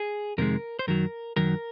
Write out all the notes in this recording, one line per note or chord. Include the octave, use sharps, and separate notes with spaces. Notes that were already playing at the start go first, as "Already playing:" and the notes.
Already playing: G#4
F2 C3 D#3 G#3 A#4
C5
F#2 D#3 F#3 A#4
F#2 D#3 F#3 A#4